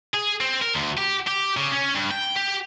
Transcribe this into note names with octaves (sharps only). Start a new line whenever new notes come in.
G#4
C4
A#4
D2
G4
G4
C#3
C#4
G2
G5
G4